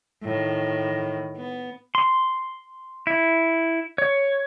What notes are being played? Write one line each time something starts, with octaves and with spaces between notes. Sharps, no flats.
A2 D#3
B3
C6
E4
C#5